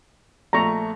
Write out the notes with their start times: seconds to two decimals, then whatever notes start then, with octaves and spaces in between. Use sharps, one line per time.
0.53 A#1 A3 A#5 C#6